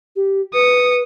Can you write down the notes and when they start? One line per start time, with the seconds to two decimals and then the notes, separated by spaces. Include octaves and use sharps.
0.16 G4
0.54 B4 D#6 C#7